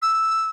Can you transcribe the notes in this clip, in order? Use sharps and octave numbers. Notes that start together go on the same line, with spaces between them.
E6